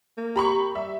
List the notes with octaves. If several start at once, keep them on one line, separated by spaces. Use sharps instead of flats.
A#3
G4 A#5 B5 C#6
G3 E5